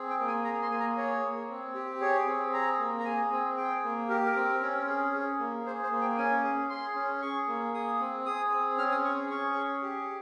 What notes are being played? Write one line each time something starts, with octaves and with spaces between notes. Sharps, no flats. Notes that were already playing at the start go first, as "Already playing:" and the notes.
Already playing: C4 G#4
G5
A#3
G#5
G#4 A#5
C6
A#3 G#5
A#5
G#4 C#5
A#3
C4
G4
G#4 C#5
C4
G#4 A#5
A#3
A#5
G#4 G#5
C4
G#4 G5
A#3
G4 A#4
A#4
C4
C#4
G#4
G#4
A#3
G#4 C5
C5
A#3
G5
C#4 G#5
G#4
G#4 C6
C#4
G#4 C#6
A#3
G#4 D#6
C4
G#4 D#6
C4
C#4 F6
D#6
G#4 C#6
C#4 C#6
G#4
G4